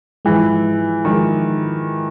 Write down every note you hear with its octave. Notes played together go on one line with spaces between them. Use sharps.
G#2 E3 F3 G#3
D#3 F3 G#3